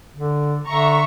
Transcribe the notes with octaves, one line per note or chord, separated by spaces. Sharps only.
D3
D3 E5 A#5 C#6